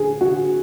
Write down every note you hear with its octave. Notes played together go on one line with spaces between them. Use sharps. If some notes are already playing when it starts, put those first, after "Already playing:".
Already playing: G#4
F#4